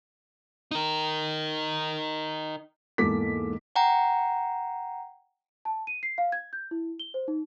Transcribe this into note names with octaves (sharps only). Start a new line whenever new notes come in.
D#4 A#4
E2 G#2 A#3 A4 D6 B6
F#5 G5 A#5
A5
D#7
C7
F5
G#6
G6
E4
G7
C5
D#4